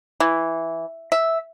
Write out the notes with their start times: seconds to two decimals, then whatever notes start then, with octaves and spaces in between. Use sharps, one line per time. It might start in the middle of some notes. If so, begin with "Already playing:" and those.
0.20 E3
1.12 E5